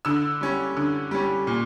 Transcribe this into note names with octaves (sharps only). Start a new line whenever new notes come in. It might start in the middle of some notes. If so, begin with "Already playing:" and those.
D3 E6
G3 C#4
D3
G3 C#4
A#2